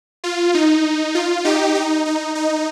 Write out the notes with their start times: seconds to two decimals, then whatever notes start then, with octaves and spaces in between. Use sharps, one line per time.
0.24 F4
0.54 D#4
1.15 F4
1.45 D#4 G4
1.75 D#4
2.06 D#4
2.35 D#4